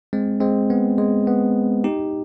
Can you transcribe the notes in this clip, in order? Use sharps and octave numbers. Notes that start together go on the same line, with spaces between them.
G#3 C4
G#3 C4
B3
G#3
B3
D#4 G4